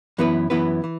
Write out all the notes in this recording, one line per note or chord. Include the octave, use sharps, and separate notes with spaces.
F#2 E3 B3 E4 B4
F#2 E3 B3 E4 B4
E3